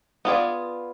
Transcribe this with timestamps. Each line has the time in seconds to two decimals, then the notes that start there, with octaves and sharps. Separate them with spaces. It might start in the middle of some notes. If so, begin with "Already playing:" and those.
0.25 B3 F4 G#4 D5